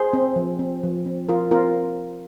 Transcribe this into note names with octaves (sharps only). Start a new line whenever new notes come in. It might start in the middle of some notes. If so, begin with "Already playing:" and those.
Already playing: G#4 C5
C4
F3
C4
F3
C4
F3 F4 A#4
C4 F4 A#4